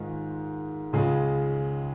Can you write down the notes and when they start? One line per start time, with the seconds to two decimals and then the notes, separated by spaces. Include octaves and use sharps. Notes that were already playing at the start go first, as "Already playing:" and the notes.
Already playing: G#2 D#3 G#3 F4 A#4
0.93 C#2 C#3 G#3 F4 G#4